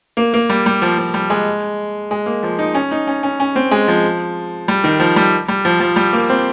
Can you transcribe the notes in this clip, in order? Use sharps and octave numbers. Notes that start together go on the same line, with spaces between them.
A#3
A#3
G3
G3
F3
F3
G3
G#3
G#3
A#3
F3
D#4
C#4
D#4
C#4
C#4
C#4
C4
G#3
F3
G3
D#3
F3
G3
G3
F3
F3
G3
A#3
C4